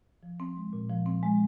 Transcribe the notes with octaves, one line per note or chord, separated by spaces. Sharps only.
F3
C4
G#3
A#2
F3
C4
G#3